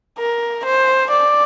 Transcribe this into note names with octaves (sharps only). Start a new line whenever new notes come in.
A#4
C5
D5